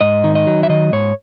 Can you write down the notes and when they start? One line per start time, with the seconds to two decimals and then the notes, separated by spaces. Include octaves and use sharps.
0.01 G#2 D#5
0.24 D#3
0.35 D#5
0.47 F#3
0.63 E5
0.69 D#3 D#5
0.92 G#2 C#5